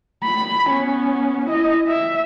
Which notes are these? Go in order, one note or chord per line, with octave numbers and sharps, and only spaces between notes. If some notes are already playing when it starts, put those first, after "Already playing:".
B5
B3 C#4
E4 D#5
E5